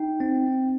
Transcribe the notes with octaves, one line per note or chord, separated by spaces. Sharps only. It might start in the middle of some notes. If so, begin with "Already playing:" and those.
Already playing: D#4 G5
C4